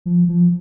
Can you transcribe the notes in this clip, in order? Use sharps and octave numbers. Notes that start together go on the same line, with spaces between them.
F3
F3